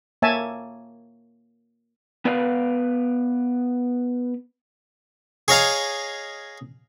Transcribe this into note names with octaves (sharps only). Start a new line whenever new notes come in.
A#3 C#5 E5 G#5 A5
B3 B4 D5 F5
G#4 C#5 D#5 F5 A#5